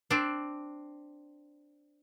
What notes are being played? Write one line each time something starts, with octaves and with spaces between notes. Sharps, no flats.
C4 D4